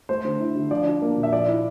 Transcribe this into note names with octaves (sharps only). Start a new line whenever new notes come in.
A3 C5
D3
E4
D3
F3 D5
D4
A#3
A#2
E5
F3 D5
E4